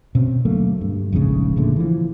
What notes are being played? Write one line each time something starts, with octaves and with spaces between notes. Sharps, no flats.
B2 C4 C#4
D2 F#3 A3 A#3
G2
F1 A#1 G#2 C#3
A#2 D3 A3
E3 F3